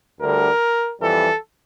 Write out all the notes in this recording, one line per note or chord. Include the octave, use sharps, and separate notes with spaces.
D2 D3 G3 A#4
F2 E3 G3 A4